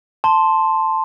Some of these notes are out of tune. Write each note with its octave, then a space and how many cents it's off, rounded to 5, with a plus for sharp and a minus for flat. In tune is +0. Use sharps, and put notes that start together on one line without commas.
A5 +0 C6 +0